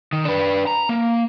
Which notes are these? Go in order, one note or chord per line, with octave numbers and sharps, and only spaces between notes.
D#3
D4 B4
A#5
A#3